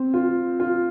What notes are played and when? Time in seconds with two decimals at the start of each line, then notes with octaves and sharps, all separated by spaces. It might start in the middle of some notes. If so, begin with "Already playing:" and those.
Already playing: C4
0.14 F4
0.60 F4